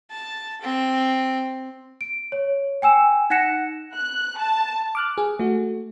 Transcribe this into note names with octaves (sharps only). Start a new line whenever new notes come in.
A5
C4
D7
C#5
G5 G#5 E6 E7
D#4 F#5 F#6 A#6 C#7 E7
F#6
A5
D6 F6 F#6
G#4
A3 F#4